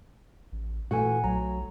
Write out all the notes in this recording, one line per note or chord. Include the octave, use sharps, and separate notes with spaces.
A1
A#2 E3 A3 F#4 F#5 G#5
B1 F#3 A#5